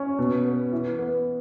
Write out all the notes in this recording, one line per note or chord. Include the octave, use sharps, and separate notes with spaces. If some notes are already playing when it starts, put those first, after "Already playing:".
Already playing: C#4
B2
B3
E3
B3